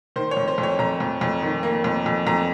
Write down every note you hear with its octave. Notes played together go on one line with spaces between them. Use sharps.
D#3 C5
C#5
F2
C5
F2
C#5
F2 A#5
F2
F2
D#3
A#3
F2
F2
F2 A#5